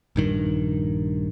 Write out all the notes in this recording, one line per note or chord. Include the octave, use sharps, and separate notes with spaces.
A#1 G2 D#3